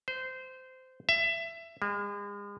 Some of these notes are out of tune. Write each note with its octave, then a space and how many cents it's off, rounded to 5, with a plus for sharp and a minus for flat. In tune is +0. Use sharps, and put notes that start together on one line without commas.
C5 -20
E5 +20
G#3 -40